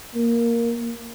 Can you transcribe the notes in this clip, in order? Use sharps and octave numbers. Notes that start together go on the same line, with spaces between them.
A#3